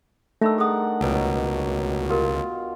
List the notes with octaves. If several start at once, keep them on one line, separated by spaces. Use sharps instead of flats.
D#3 A3 D4 E5 B5 E6
G#4 A#4 F#5 D#6
C#2 B2 F#3 G5
F4 G4 A#4